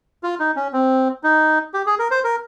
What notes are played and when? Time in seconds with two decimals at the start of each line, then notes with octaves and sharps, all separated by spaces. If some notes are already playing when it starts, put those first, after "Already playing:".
0.23 F4
0.40 D#4
0.56 C#4
0.73 C4
1.23 D#4
1.74 G4
1.86 G#4
1.99 A#4
2.11 C5
2.24 A#4